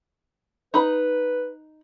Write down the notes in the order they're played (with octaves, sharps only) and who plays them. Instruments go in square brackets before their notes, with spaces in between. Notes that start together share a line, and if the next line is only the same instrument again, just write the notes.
[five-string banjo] D#4 B5 [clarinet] B4